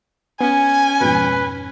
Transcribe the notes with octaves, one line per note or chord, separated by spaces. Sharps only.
B3 C#4 G#5
F2 G#2 B2 B4